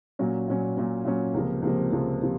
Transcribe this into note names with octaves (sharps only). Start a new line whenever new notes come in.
A#2 F#3 C#4
A#2 F#3 C#4
A#2 F#3 C#4
A#2 F#3 C#4
C#2 C3 F3 A#3
C#2 C3 F3 A#3
C#2 C3 F3 A#3
C3 F3